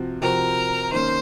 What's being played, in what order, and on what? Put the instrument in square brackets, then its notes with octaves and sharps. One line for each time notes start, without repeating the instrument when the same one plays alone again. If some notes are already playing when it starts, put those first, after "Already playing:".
Already playing: [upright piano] C3 F3 C4 F#4
[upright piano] C3 F3 C4 F#4 [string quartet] A#4
[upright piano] D#3 A#3 C#4 [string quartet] C5